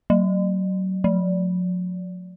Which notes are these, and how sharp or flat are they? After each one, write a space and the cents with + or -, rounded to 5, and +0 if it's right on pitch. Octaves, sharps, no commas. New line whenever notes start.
F#3 +25
F#3 -45